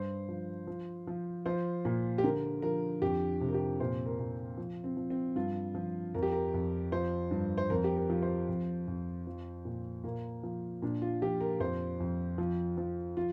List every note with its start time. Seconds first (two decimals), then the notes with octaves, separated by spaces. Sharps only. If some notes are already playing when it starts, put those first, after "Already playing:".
Already playing: G2 C5
0.29 F3
0.67 F3
1.07 F3
1.46 F3 C5
1.85 A#2
2.18 G4
2.24 D3 A#4
2.62 F3 A#4
3.02 F2 G4
3.41 C3
3.49 A#4
3.54 G4
3.80 A#2 C5
4.06 A#4
4.19 A#2
4.57 F3
4.84 C4
4.97 F3
5.10 C4
5.36 G2 F4
5.75 F3
6.15 F2 A#4
6.23 G4
6.32 A#4
6.54 F2
6.92 F3 C5
7.31 G2
7.58 C5
7.70 F2 A#4
7.84 G4
7.97 A#4
8.10 F3
8.22 C5
8.49 F2
8.88 F2
9.27 F3
9.65 A#2
10.04 A#2 A#3
10.43 F3
10.82 A#2 D4
11.02 F4
11.22 F3 G4
11.41 A#4
11.60 F2 C5
12.00 F2
12.38 F3
12.77 F3
13.17 F3 F4